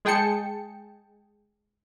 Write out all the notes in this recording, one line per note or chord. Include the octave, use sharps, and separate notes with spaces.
G#3 G#4 G5 A5 C#7